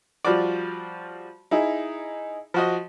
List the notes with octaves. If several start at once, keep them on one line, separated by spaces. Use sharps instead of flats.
F3 G3 F4 F#4 D5
D#4 E4 G#4
F3 F#4 D#5